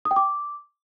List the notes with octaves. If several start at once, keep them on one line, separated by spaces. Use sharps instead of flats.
D#6
G5
D6